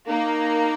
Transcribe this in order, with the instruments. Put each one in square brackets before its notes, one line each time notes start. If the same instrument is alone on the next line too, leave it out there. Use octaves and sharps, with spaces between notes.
[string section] A#3 [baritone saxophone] D#4